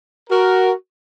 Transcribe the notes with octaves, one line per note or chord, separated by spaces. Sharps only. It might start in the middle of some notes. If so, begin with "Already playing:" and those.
F#4 A#4